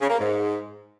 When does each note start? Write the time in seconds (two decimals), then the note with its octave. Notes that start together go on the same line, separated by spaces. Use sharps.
0.01 C#3
0.10 A#3
0.19 G#2